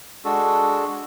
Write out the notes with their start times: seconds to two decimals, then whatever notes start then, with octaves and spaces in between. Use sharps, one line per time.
0.25 G#3 D4 F#4 A4